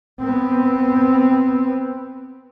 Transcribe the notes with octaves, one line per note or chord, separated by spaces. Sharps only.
B3 C4